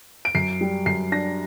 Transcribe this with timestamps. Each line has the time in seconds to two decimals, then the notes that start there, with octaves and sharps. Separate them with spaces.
0.25 D7
0.35 F#2 C7
0.61 G3
0.86 F#2 C7
1.12 D4 A#6